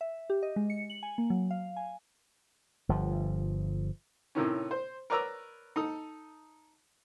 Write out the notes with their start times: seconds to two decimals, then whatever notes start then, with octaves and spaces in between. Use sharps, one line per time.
0.01 E5
0.30 G4
0.43 D#5
0.56 G#3
0.70 C#7
0.90 F#7
1.03 G#5
1.18 A#3
1.30 F#3
1.51 F5
1.77 G#5
2.89 G1 F3
4.35 A2 C3 D#3 C#4
4.71 C5
5.10 A#4 B4 C#5 D5 A#5 E6
5.76 D#4 A4 D#6